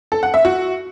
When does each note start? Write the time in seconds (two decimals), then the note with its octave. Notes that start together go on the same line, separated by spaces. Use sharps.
0.12 A4
0.23 F#5
0.34 E5
0.45 F#4